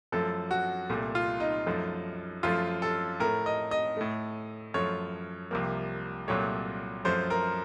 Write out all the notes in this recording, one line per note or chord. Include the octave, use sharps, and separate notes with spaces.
F#2 F3 A3 A4
F#4
C2 A#2 A3
F4
D#4
F#2 F3 A3
F#2 F3 A3 F4
A4
A2 A3 A#4
D#5
D#5
A2 A3
F#2 F3 A3 C#5
C2 C3 F3 A#3
C2 A#2 F#3 A3 C#5
F#2 F3 A3 C5
A#4